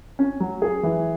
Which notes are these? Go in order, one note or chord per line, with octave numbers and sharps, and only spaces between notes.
C#4
F#3
G#4
E3